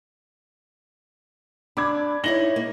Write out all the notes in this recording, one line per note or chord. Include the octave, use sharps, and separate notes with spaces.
D4 B5 D6 G#6
D#4 E4 C#5 A#6 F#7 G7
A#3